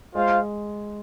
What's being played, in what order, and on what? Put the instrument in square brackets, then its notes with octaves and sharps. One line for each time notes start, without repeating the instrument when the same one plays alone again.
[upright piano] G#3 [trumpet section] F4 C5 F5